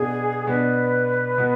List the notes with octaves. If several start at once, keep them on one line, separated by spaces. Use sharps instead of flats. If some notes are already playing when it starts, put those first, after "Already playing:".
Already playing: B2 B3 D4 G#4
B2 B3 D4 B4
B2 B3